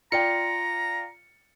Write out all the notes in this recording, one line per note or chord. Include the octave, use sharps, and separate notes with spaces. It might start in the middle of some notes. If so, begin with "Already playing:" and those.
F4 D5 G5 A#5 C#7